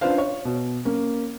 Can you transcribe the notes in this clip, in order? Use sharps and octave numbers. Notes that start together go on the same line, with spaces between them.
C#4 D4 F4 B4 C5 F5
C#5
B2
A#3 C#4